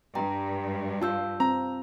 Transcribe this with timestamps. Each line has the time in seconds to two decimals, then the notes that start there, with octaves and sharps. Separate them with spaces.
0.15 G2 G5 A#5
1.02 F4 A5 E6 G6
1.40 C4 A#5